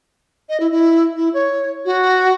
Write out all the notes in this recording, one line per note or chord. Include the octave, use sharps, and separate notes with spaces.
D#5
E4
E4
E4
C#5
F#4